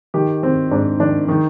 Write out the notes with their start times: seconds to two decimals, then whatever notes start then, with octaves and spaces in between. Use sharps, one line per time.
0.14 D#3 G4
0.43 D#3 C4
0.71 G#2 D4
1.00 D#3 D4
1.28 D#3 D#4